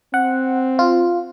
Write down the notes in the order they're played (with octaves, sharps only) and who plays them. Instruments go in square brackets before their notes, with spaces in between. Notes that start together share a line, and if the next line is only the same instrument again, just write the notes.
[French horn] C4 [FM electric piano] F#5
[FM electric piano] F4